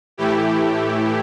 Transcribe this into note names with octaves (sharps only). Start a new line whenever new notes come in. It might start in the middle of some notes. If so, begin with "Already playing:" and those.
A2 E3 A3 E4 G4